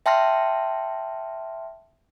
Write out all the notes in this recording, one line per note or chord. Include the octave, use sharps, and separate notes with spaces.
E5 G5 A5 C6 F6 A#6